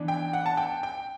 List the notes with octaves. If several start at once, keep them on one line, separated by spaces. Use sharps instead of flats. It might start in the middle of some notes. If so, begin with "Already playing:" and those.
Already playing: E3 B3 D4
G5
F#5
A5
G5
G5